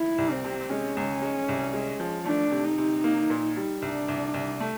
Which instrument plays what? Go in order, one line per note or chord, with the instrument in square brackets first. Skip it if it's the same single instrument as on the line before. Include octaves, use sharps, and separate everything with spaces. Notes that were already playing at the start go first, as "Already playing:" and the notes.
Already playing: [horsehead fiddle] E4
[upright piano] C2
[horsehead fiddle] C4
[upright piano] C3
[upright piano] G#3 [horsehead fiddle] C#4
[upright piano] C#2
G#3
C2
G#3
F3
[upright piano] A3 [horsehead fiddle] D4
[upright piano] C3
[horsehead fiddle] D#4
[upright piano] C3
A#3
A#2
G3
[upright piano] C2 [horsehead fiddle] D4
[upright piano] C2
C2
A3